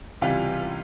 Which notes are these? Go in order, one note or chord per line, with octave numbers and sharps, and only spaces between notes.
C#2 C3 E3 G3 F4 F5